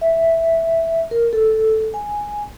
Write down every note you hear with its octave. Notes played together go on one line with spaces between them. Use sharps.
E5
A#4
A4
G#5